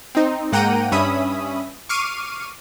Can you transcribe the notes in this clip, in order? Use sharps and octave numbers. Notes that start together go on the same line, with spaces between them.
C4 D#4
G#2 A#3 F#5 G5 A#5 D#7
G2 C#4 E5 B5 D#6
C#6 D6 F6 C7 D#7